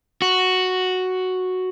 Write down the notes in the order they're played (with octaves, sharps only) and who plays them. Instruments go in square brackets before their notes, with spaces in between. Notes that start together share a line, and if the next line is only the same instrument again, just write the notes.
[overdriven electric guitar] F#4